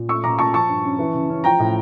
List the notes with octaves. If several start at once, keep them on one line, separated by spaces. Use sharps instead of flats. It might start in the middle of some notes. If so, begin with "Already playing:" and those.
Already playing: A#2
A3 C#6 E6
A#2 A#5 D6
A#2 A5 C#6
F3 A5 C#6
G2
C#4
E3
C#3
C#4
F3 G5 A#5
A2